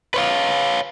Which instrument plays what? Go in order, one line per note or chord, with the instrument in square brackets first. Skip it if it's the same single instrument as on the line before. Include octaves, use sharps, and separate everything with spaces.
[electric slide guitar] B4 C#5 F5